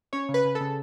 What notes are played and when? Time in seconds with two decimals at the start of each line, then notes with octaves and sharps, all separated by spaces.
0.13 C#4 C#5
0.29 C#3
0.34 B4
0.45 C#3
0.55 A4
0.61 C#3